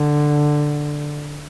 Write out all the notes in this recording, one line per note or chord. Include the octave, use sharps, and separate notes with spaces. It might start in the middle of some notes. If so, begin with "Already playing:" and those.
Already playing: D3